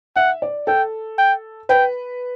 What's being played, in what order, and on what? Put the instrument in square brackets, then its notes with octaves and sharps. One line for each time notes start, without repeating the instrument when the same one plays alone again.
[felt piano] E5 [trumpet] F#5
[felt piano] D5
[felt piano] A4 [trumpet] G5
[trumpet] G5
[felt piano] B4 [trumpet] G5